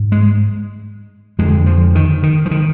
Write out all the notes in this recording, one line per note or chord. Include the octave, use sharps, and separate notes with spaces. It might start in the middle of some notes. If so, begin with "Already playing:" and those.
Already playing: G#2
G#3
F2 D3 G#3
F3
D#3
D#3
F3
D#3